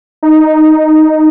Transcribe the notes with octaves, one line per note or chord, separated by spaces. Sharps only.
D#4